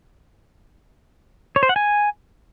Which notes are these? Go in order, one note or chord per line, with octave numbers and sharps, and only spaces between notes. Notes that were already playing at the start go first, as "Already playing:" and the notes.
C#5
C5
F#5
G#5